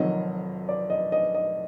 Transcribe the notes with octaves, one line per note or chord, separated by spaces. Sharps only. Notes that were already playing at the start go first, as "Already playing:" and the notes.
Already playing: F1 F2 D#3 F#3 D#5
D5
D#5
D#5
D#5